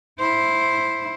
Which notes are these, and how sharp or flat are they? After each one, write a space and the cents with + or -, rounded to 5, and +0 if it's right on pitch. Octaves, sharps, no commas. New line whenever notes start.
E4 +0 C5 +5